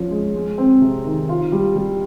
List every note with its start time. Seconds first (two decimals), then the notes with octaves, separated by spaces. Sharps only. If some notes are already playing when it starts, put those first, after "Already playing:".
Already playing: F3 C#4 F4
0.11 G#3
0.35 G#3
0.58 C4
0.81 C3
1.05 D#3
1.29 F4
1.52 G3
1.76 G3